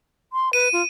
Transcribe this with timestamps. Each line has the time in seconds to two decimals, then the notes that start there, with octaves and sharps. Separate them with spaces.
0.33 C6
0.53 B4 D#7
0.73 F4